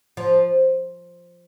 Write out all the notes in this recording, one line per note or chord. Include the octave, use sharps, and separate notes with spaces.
F3